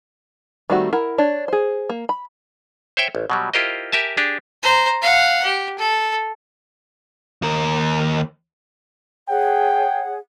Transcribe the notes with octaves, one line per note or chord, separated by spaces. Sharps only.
D#3 G3 A3 C4 F#4
E4 A#4 F#5
D4 C#5
G#4 C5
A#3
B5
C5 C#5 E5 G5
A1
B2 F#3 G3
E4 F4 G4 A#4 C5 D#5
G4 A#4 E5 G#5 A5
D4 G4 G#4
C5 A#5
F5 F#5
G4
A4
D#2 A#4
G#4 C#5 F#5 G5